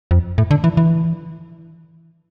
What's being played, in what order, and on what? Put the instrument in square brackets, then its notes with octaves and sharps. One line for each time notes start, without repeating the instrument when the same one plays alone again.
[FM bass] F2
A2
D3
E3
E3